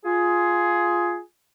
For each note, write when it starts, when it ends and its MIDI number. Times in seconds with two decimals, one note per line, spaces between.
0.04 1.18 65
0.04 1.18 68